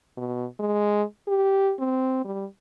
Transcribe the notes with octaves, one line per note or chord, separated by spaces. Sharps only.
B2
G#3
G4
C4
G3